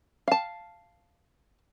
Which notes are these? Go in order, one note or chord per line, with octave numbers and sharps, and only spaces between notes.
F5 A5